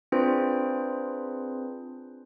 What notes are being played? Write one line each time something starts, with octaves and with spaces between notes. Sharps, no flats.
C4 D4 F4 G#4 B4 C5